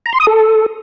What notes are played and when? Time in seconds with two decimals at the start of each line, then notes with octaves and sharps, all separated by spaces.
0.06 A#5
0.13 C6
0.20 D#6
0.27 A4